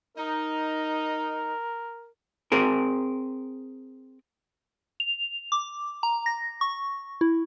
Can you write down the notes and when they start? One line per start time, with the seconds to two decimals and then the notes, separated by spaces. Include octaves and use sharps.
0.17 D#4 A#4
2.52 C4 G#4 A#4
5.00 F7
5.52 D6
6.03 A#5
6.26 A#6
6.61 C#6
7.21 E4